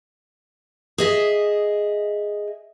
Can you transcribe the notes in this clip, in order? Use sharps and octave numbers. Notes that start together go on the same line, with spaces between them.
G#4 D#5 E5